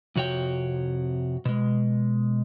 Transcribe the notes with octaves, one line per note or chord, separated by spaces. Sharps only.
F2 C3 F#4 C#5 G5
B2 G#3